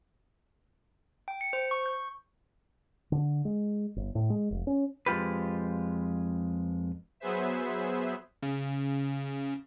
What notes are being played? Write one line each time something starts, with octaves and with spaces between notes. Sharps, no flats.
G5
C#7
C5
C#6
G6
D3
G#3
G1
A2
G#3
F1
C#4
F2 G#3 F4 G4 B4
F#3 B3 G#4 B4 C5 E5
C#3